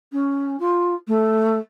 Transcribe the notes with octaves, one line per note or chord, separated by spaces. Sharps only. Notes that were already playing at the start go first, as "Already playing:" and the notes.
C#4
F4
A3